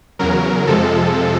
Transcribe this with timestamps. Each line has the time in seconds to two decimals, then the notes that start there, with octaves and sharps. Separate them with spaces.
0.19 E2 C#3 F#3 A#4
0.67 F2 C3 F3 G#3 A4